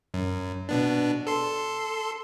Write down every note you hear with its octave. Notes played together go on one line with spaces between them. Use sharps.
F#2
B2 B3 D4
A4 C6